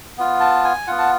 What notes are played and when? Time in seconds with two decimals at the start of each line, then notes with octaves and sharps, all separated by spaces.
0.18 B3 F4
0.40 A5
0.64 G#5
0.87 B3 F4 F#5
0.99 A5